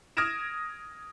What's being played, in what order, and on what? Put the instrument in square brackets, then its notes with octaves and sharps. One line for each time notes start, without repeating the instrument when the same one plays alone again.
[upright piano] D#6 F6 G#6 A#6 D7 E7